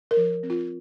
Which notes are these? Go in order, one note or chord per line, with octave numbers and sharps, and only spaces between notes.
A#4
F3
C4
F4